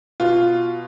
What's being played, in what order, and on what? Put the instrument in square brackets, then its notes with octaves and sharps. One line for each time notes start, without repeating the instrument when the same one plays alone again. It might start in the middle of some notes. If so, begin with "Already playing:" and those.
[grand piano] B2 F4